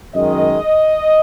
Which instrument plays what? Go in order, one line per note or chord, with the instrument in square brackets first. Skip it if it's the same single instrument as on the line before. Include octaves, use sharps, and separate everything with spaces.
[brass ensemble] F#2 D#3 G#3 D#5